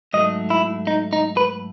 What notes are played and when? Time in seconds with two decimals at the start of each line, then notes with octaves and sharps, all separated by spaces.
0.13 G#2 F#3 A3 D#5
0.50 E4
0.87 D#4
1.13 D#4
1.37 B4